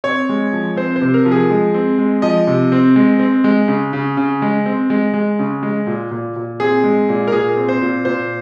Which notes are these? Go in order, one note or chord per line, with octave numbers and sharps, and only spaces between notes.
C4 C#5
G#3
F3
C4 C5
C5
C3
A#4
F3
G#4
G#3
C4
G#3
F3 D#5
C3
C4
G#3
C4
G#3
C#3
C#3
C#3
G#3
C4
G#3
G#3
C#3
G#3
A#2
A#2
A#2
C4 G#4
G#3
A#2
A#4
A#2 G#4
C4
C5
A#2
A#2 C5